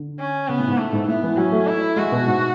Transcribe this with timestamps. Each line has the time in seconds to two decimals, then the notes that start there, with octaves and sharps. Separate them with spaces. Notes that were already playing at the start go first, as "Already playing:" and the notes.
Already playing: D3
0.20 C#4
0.48 C#3 B3
0.59 A2
0.68 G#2
0.78 A2 A3
0.93 G#2
1.08 A2 B3
1.23 E3
1.37 F#3 C#4
1.52 A3
1.67 E4
1.96 G#3 F#4
2.12 B2
2.27 G#2